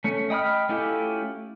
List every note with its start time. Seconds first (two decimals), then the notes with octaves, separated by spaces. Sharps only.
0.04 A3 C#4
0.30 D#5 G5 B5 D#6 F6
0.69 A3 C#4 E4 F4 G4